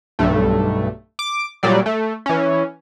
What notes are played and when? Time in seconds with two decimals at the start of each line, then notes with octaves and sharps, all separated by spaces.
0.19 B1 G2 A3
1.19 D6
1.63 A#2 F#3 G3 D5
1.86 A3
2.26 E3 C#4